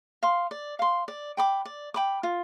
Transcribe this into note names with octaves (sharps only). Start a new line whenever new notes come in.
F5 C6
D5
F5 C6
D5
G5 B5 D6
D5
G5 B5 D6
F4